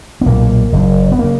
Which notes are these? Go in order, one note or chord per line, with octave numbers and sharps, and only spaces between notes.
B3
B1 A#2 A#3
F#1 F#2 C#3
B3
C#3 A#3